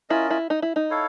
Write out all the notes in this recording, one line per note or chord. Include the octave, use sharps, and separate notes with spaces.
C#4 E4 F4 A#4 D#5
E4
D#4
E4
D#4
E4 A4 C#5 F5